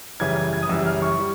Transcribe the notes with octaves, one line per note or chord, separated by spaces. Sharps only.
F#2 C#3 E3 G3 G#6
G#6
G#6
D#6
F#2 C#3 E3 G3 E6
F6
C#6
G3